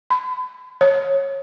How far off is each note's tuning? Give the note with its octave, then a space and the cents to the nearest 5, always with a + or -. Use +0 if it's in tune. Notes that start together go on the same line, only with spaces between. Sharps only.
B5 +45
C#5 -20